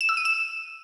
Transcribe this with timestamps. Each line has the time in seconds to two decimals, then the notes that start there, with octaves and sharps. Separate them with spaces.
0.01 E7
0.09 E6
0.17 D#7
0.25 E7